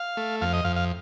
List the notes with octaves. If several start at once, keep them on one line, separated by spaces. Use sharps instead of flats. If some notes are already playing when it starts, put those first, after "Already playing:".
Already playing: F5
A3
F2 F5
D#5
F2 F5
F5